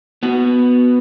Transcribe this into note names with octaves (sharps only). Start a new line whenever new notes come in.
B3 F#4